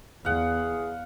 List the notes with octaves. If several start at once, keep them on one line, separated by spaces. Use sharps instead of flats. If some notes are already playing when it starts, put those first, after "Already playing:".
E2 G#4 F5 F#5